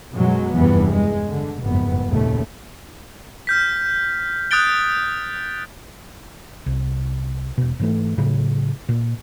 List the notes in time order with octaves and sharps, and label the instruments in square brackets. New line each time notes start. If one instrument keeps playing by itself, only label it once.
[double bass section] F#2 B2 F#3 G#3
F1 E2 G2 E3 B3
G#3
D3
F#1 F2 G#2 B3
D#2 A#2 C#3 A3
[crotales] F6 G6 B6
D#6 F#6 G6 A6 D7 G7
[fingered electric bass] C2
E1 B2
G#2 E3 A3
A2 C#3 F#3
A#2